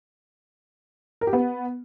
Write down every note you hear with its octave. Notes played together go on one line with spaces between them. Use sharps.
A#4
G4
B3